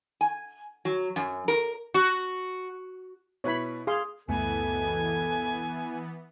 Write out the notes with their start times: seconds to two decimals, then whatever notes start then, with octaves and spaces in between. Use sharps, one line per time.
0.21 G#5
0.85 F#3
1.16 F#2
1.48 A#4
1.94 F#4
3.44 B2 E4 B4 C#5 B5
3.87 G#4 F5 C6
4.28 C#2 F#2 B2 E3 A3 B3 A4 G#5